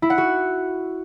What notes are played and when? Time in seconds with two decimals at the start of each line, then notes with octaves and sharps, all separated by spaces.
0.02 E4
0.10 F#5
0.18 F#4